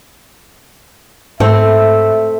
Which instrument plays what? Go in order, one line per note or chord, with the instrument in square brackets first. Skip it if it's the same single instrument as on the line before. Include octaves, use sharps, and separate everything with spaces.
[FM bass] G#2 [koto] A3 C4 [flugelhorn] E5